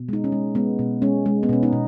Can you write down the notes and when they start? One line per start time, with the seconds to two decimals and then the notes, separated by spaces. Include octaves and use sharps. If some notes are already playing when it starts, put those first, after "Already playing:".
Already playing: B2
0.09 G#3 D#4
0.24 C#4
0.32 G#3
0.55 G#3 B3
0.79 B2
1.02 G#3 C#4
1.26 G#3
1.43 B3
1.49 B2 C#4
1.63 D#4
1.73 B2